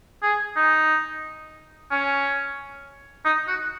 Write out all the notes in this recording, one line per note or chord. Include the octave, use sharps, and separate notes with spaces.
G#4
D#4
C#4
D#4
F#4